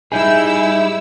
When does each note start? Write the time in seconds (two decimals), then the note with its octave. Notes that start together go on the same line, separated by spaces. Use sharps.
0.12 G3 D#4 E4 G#4 E6